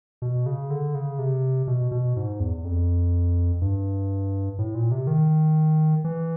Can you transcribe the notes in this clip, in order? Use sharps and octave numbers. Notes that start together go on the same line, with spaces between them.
B2
C#3
D3
C#3
C3
B2
B2
G#2
E2
F2
G2
A2
A#2
C3
D#3
E3